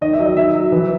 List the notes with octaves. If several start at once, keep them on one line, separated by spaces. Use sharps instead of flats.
D#3 D#5
E5
F#3
D#5
D#3 E5
F#3
E3